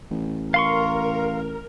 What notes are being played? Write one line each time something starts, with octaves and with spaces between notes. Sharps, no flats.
A1
A#4 F5 C6 C#6